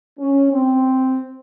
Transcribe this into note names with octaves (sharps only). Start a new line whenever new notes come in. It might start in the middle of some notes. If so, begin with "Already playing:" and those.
C#4
C4